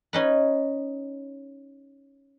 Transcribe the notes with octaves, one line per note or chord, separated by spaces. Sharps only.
C#4 D#4 B4